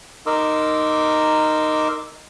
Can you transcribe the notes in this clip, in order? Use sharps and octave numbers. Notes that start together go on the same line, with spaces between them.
D#4 A#4 C6 D6 E6